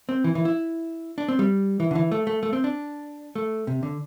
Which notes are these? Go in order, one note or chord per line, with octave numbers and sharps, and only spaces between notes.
C4
E3
E3
E4
D4
C4
G3
E3
D3
E3
A3
A3
A3
C4
D4
A3
C3
D3